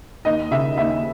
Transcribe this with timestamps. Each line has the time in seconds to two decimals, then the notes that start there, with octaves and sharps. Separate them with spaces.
0.25 D#2 D#5
0.51 C#3 E5
0.77 D#2 E5